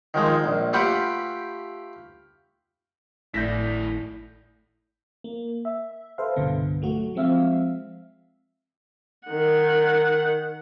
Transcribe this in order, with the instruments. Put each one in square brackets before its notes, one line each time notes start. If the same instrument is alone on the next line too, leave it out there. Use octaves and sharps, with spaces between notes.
[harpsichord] D#3 F3 G#3
A#1
A3 F4 G4 B4 F#5 G5
[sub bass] G#1 [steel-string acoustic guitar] A2 [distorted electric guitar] E4 D5 [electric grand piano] G6 A#6 B6
[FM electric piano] A#3
E5
A4 B4 C5 E5 F5
C2 G2 B2 D3 B3
F#3 A3 F#4
F3 G#3 C4 E5 F5
[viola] D#3 F#5